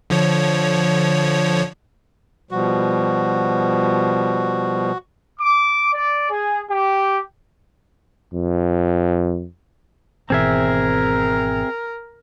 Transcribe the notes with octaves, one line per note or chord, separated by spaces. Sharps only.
D3 F3 C#5
B2 F3 G3 F#4
D6
D5
G#4
G4
F2
G#1 B2 E3 C4 G#4 A#4 E5